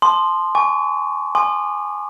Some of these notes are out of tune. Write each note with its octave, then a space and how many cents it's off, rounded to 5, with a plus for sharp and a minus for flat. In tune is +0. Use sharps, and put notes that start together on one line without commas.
A5 -20 C6 +0 D#6 -40
G#5 +0 C#6 +25
G#5 +0 C6 +0 D#6 -40